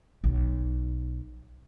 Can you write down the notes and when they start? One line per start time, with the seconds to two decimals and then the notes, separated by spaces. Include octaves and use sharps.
0.24 B1